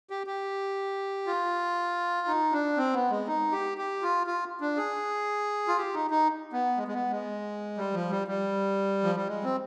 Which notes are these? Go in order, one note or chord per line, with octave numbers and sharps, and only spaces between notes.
G4
G4
F4
D#4
D4
C4
B3
G#3
D#4
G4
G4
F4
F4
D4
G#4
F4
G4
D#4
D#4
B3
G#3
G#3
B3
G#3
G3
F3
G3
G3
F3
G3
G#3
C4